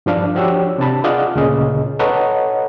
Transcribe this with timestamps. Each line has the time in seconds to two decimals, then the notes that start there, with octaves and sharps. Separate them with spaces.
0.06 G2 F3 D4 F5
0.35 F3 D4 F#4 G4 C#5 E6
0.78 C3 D4 A5 B5
1.04 F4 G#4 D5 D#5 F5 F#5
1.35 D2 A#2 C#3 G#4 D#5
1.99 A4 B4 C#5 D#5 F#5 A#5